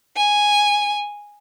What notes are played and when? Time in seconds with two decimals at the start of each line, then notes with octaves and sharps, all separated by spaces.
0.17 G#5